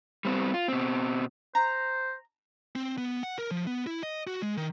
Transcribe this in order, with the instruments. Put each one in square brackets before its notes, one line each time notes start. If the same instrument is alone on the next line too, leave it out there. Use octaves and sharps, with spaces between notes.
[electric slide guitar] G3 B3 C4
F4
B2 C4
[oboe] C5 [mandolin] A#5
[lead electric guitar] C4
B3
F#5
A#4
F3
B3
E4
D#5
F#4
G#3
D#3